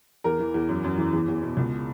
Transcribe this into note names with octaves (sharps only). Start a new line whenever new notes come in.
E2 A#4
E3
E2
F#2
F#2
E3
E2
E2
B2
C#2